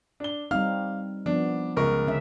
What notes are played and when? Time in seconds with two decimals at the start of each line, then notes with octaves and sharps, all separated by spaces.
0.20 D4 G7
0.51 G3 C4 D#4 F5 F6
1.26 F3 B3 D4
1.77 C#2 A#4 C#6
2.06 D3 C#4 E5